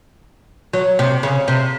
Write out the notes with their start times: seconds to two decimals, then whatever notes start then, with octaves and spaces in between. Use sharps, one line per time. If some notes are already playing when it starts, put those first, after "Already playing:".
0.73 F#3
0.99 C3
1.23 C#3
1.48 C3